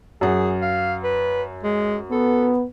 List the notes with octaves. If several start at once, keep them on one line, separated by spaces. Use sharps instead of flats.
F#2 G#4 F#5
F5
B4
G#3
B3 A4